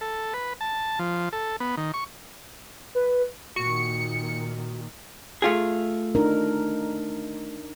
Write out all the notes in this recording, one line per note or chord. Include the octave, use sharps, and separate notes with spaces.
A4
B4
A5
F3
A4
B3
D#3
C#6
B4
A#2 D#3 F#4 C#7
A3 F4 G#4
D4 D#4 A#4